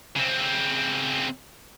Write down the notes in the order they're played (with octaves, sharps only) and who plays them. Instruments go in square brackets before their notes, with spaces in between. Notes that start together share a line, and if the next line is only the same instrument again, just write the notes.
[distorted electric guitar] C#3 C4